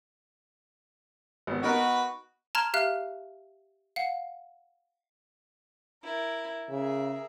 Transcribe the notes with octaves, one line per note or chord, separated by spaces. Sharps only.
G#1 B3
B3 D#4 F#4 A#4 B4
A5 A#5 C6 F6 G#6
G4 E5 F5 F6 F#6
F5 F#5
E4 A#4
C#3 G#4 A#4 E5